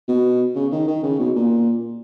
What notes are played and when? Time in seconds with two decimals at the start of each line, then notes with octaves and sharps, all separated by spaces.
0.08 B2
0.55 C#3
0.72 D#3
0.87 D#3
1.03 C#3
1.19 B2
1.35 A#2